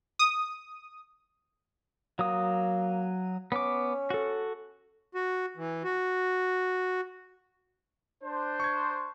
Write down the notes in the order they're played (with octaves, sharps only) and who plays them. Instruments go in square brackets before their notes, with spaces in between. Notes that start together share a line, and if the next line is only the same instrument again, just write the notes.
[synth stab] D#6
[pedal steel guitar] F#3 D#6 [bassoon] A#3
[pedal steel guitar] B3 D6 [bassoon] C#4
[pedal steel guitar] F#4 A4
[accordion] F#4
E3
F#4
[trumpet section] D4 C5
[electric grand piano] C#6 G#6